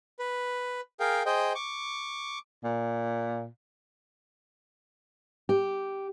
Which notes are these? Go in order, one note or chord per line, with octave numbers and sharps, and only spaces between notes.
B4
G#4 A#4 F5 G5
G#4 C5 D#5 G5
C#6 D6
A#2
G4